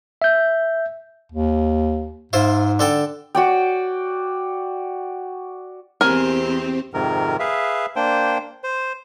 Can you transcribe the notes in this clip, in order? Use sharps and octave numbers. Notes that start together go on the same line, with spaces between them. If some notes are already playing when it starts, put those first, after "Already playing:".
E5 G6
D#2
G#2 E4 F4 C5
D3 A4 G5
F#4 D5 G5
E2 C4 G4 A#4 C5 G#5
F2 G#2 C3 D#3 A#4
G#4 B4 E5 F5
A#3 D4 C5 G5
C5